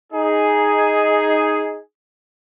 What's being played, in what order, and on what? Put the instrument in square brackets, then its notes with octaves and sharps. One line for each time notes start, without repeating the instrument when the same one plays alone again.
[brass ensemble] D#4 G#4